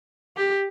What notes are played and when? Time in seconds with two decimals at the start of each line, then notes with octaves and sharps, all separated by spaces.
0.37 G4